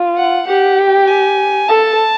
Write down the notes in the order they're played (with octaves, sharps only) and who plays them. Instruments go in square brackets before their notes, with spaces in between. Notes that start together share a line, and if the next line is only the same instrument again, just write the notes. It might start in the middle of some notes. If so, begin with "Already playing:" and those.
Already playing: [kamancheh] F4
[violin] F#5
[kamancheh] G4 [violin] F#5
[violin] G5
G#5
[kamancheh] A4 [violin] A5